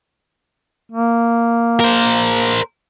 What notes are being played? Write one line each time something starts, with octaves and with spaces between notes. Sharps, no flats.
A#3
A#4 C5